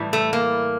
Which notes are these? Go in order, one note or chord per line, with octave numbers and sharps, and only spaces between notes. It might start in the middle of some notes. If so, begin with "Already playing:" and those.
Already playing: A2 E3 G3
A3
A#3